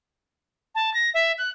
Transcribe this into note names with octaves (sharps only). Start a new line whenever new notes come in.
A5
A#6
E5
F#6